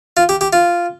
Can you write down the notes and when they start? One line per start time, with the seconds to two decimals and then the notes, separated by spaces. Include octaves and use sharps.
0.17 F4
0.29 G4
0.41 G4
0.53 F4